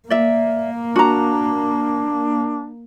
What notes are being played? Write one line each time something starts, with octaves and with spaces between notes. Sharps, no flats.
A#3 D5 E5
D4 F#4 A#5